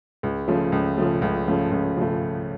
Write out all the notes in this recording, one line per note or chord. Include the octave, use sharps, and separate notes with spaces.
C#2
C#3 F3 A3
C#2
C#3 F3 A3
C#2
C#3 F3 A3
C#2
C#3 F3 A3